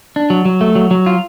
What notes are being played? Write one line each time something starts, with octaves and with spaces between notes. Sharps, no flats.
D4
F#3
F#3
A3
F#3
F#3
F4